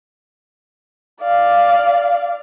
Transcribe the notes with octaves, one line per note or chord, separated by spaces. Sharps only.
D5 F5